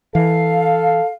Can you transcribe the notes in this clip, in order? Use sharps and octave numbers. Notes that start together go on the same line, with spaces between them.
E3 A4 F5